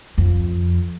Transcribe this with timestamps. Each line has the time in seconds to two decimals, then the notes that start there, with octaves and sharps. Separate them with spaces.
0.18 F2